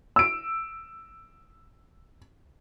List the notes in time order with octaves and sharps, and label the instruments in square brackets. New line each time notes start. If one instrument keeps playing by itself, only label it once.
[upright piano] E6 D7